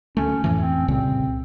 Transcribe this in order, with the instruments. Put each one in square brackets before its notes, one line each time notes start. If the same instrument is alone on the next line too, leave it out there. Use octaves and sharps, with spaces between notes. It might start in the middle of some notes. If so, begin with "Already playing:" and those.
[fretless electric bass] D2 A3 [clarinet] C#4
[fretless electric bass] F2 A2 E3 [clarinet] C#4
[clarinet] C4
[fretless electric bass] C2 A#2 C#3 [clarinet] C4